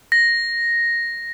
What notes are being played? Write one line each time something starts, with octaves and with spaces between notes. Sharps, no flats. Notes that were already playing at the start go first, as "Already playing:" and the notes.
A#6